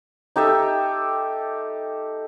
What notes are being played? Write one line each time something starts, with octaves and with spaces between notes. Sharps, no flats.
D#4 G4 A4 E5